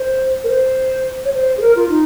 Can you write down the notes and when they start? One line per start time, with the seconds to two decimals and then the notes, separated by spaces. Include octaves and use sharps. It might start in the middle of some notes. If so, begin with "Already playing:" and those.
Already playing: C5
0.44 A#4
0.49 C5
1.25 C#5
1.33 C5
1.57 G#4
1.62 A#4
1.76 F4
1.89 D#4